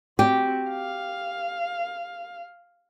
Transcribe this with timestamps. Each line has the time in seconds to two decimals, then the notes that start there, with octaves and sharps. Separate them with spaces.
0.19 C4 F#4 G4
0.71 F5